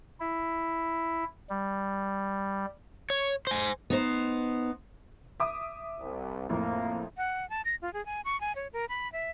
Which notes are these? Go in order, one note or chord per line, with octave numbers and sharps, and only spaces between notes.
E4
G3
C#5
C5 G#5
B3 D#4 C5
E5 D6 D#6
C2
F2 A2 A#3
F#5
A5
A#6
F4
G#4
G#5
C#6
G#5
C#5
A#4
B5
E5